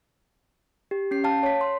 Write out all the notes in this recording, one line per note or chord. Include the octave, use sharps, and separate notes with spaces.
G4
C#4 C7
F5 G5 A5 F6
C#5 B6
C6